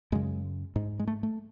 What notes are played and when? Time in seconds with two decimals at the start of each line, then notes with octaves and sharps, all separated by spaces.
0.12 F#2 C#3 G#3
0.76 G#2
0.99 G#3
1.07 A3
1.23 A3